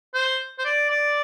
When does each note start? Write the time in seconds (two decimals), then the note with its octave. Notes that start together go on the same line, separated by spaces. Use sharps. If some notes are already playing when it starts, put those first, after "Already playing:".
0.14 C5
0.58 C5
0.65 D5
0.90 D5